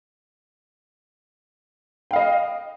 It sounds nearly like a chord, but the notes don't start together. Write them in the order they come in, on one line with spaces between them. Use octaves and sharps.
G5 F5 D#5